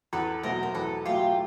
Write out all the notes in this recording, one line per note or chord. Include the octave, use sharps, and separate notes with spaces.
E2 A4 B4
B2 F#3 A3 A#4 C5
A#4
E2 A4 B4
B2 F#3 A3 F4 G4